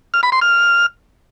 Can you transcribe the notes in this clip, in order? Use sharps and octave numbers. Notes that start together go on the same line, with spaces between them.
F6
B5
C6
F6